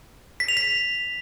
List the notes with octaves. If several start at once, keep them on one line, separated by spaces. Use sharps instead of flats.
B6
F7
B6